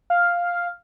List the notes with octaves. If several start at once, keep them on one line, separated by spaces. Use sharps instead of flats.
F5